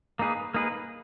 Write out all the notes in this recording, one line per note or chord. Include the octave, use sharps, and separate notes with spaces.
A#3 D#4 G#4 B4
A#3 D#4 G#4 B4